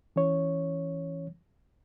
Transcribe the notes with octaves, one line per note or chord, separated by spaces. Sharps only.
E3 C#4 C#5